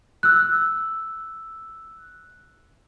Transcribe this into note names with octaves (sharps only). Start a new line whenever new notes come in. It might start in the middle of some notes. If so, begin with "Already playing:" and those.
E6 F#6